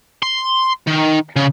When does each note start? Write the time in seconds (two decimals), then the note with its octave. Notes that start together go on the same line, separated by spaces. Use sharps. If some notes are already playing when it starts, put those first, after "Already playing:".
0.23 C6
0.87 D#3
1.36 C#3